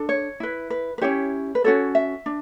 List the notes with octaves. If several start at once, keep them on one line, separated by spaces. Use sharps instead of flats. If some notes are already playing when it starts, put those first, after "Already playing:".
Already playing: D4 A4
C#5
E4 B4
B4
B4
C#4 E4 G4 C#5
B4
C#4 F#4 A4 C#5
E5
D4